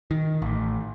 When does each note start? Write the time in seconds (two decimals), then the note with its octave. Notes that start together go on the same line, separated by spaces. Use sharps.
0.11 D#3
0.42 A1